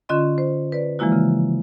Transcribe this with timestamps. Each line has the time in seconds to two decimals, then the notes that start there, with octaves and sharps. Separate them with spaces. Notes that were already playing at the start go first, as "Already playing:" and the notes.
0.09 D3 C#4 F4 D#5 C6
0.38 C5
0.72 B4 D5
0.99 E3 F3 G#3 A#3 E4 F#4
1.12 C#3